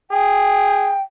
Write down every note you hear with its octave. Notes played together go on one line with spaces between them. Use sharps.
G#4 G5